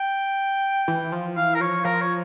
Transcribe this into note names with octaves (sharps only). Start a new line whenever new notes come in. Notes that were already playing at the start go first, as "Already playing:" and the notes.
Already playing: G5
E3
F3
E3 F5
A#4
F3 C#5
F3 A#4
C#5